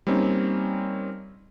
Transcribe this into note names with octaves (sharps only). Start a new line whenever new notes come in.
G3 A#3 C4 C#4 D#4